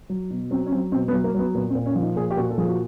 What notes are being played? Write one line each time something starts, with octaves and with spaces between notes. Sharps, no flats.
F#3
B2
F#3 C4
C#4
F#3 C4
B2 C4
B3
F#3
A#3
F#3 B3
A#2 B3
C4
A#2
C#4
F3
D#4
A#2 G#4
G4
A#2 F#4
A4
F3 G#4
F#4